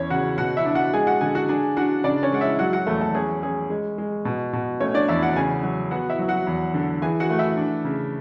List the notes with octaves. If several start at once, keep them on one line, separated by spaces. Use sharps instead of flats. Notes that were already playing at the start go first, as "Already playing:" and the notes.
Already playing: E2 C#4 C#5
C#3 F#4 F#5
B2 F#4 F#5
E4 E5
D4
F#4 F#5
G#3 G#4 G#5
F#4 F#5
D3 G#4 G#5
F#4 F#5
D4 G#4 G#5
D4 F#4 F#5
C#3 D4 D5
C#4 C#5
G#3 F#5
E4 E5
F#3 F#4 F#5
F#4 F#5
E2 A3 A4
A3 A4
C#4 G#4
C#4 G#4
G#3
G#3
B2
B2
A3 C#4 C#5
D4 D5
E2 E4 E5
F#4 F#5
C#3 G#4 G#5
F#3
B3 F#4 F#5
E4 E5
F#3
F#4 F#5
E2
D3
E3 G#4 G#5
F#4 F#5
A3
E4 E5
D4
C#3